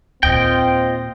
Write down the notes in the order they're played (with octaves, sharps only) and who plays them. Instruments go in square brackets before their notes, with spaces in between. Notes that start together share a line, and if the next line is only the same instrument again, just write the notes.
[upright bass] D#2 A#2 [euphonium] C4 [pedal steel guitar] F4 D#5 G5